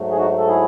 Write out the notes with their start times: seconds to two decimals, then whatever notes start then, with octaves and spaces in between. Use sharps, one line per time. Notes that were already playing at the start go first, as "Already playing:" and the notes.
Already playing: G#2 F#3 A3
0.11 G#4
0.17 D#4 F#4
0.38 A4
0.48 E4 G#4